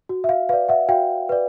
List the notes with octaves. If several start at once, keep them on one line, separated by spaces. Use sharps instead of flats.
F#4
E5
F5
B4 D5 F5
E5 F#5
F#4 F5 G5
B4 D5